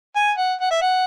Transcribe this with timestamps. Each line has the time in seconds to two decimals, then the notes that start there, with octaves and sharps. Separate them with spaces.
0.16 G#5
0.38 F#5
0.61 F#5
0.71 E5
0.82 F#5